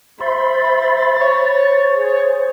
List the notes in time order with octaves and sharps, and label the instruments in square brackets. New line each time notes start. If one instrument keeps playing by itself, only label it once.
[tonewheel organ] C5 E5 C6 [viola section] B5 [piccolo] A6
[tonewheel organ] C5 [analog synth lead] C#5
[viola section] G#4